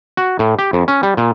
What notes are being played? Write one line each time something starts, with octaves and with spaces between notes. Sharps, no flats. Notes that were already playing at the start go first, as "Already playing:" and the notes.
F#4
A2
G4
F2
C#4
G3
A#2